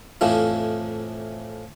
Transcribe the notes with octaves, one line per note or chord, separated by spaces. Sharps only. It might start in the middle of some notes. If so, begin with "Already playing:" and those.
F2 A2 E3 F3